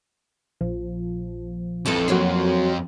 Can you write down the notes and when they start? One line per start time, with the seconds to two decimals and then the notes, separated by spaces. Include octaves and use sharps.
0.61 A#1 F3
1.86 F2 E3 A4 A5
2.08 F#2 F#3 A#3 F#4 C#5 C6